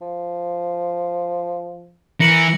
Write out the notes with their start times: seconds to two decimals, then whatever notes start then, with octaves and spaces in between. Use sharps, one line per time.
0.01 F3
2.20 E3 A#4 A#6 C#7 F#7